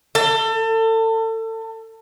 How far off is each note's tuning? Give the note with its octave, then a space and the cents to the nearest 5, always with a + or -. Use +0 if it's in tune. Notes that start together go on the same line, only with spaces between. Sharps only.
A4 +30